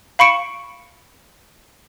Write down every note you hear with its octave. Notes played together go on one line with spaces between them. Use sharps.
F5 B5 C#6 C#7 D7 E7